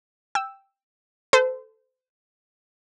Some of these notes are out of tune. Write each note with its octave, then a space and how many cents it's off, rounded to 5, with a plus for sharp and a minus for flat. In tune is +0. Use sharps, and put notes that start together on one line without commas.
G5 +0 E6 +0
A4 +0 C5 -30